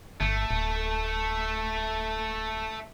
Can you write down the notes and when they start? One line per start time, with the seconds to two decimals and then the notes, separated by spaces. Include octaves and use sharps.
0.21 G1 A3
0.51 D1